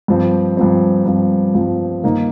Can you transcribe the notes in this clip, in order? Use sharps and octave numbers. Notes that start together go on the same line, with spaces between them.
G2 F3 C4
G2 F3 C4
G2 F3 C4
G2 F3 C4
G2 D#3 A#3 D#4